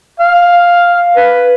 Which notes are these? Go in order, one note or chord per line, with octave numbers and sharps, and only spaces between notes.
F5
B4